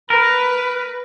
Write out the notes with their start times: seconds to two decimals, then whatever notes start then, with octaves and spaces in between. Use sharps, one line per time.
0.10 A#4 B4